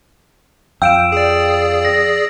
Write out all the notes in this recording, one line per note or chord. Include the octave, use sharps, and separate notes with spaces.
F2 F5 G5 E6 D7 E7
G#4 D5
A#6